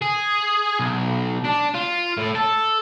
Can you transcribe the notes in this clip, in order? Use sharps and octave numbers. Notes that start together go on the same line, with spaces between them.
G#4
B1
D4
F4
A2
A4